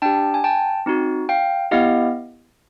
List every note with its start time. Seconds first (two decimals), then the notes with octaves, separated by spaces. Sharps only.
0.02 D4 G4 G5 A5
0.34 G#5
0.44 G5 A5
0.86 C4 D#4 F#4
1.29 F5 G5
1.71 B3 E4 G4 D#5 F5